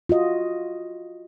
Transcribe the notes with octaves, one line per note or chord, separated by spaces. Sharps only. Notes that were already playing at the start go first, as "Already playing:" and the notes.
F4 F#4 D#5